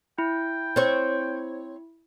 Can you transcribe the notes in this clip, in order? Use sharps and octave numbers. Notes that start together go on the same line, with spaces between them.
E4 G5
C4 C5 C#5